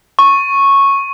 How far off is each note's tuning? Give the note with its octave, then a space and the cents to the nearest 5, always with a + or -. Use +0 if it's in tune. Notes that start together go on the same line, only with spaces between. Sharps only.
C#6 -10